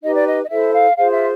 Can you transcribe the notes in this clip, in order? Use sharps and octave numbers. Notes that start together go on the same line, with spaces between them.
D#4 G4 B4 D#5
D5
D#5
D#5
E4 A4 C5 E5
F5
F4 G#4 C5 F5
E5